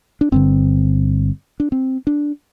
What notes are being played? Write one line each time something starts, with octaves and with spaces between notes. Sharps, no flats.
D4
G1 G2 D3 C4
D4
C4
D4